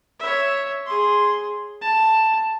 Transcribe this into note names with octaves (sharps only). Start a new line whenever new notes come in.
C#5 E5
G#4 C6
A5